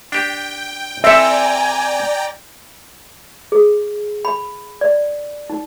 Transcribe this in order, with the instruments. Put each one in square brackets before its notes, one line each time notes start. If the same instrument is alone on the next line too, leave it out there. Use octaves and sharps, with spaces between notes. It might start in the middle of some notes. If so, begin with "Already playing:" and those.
[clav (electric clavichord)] D4 G4 [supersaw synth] G5
[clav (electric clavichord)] C4 A4 [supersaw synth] D5 G5 A#5 [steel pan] E5 [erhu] G#5
[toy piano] G#4
B5
D5
D#4